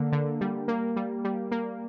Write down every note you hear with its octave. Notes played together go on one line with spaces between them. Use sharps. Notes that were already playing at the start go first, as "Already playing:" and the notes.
Already playing: D3 A#3
D3
G3
A#3
G3
G3
A#3